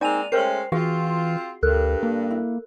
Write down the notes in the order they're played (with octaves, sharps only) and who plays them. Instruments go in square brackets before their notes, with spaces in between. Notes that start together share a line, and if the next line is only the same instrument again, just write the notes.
[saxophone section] G#3 A#3 C4 [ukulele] D#4 G#5 [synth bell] D5 D#7 F7
[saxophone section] G#3 A3 C#4 [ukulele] A#4 C5 G5 [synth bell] C7
[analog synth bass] E3 [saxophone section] C4 F4 [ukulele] F#4 G#4 F5
[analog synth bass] D2 [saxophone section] G2 [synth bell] A4 A#4 F#6
[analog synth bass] A#3
[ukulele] E4